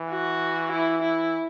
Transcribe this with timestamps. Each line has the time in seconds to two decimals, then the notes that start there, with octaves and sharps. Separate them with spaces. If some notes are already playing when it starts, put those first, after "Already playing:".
Already playing: E3
0.10 F#4
0.72 E4
1.02 E4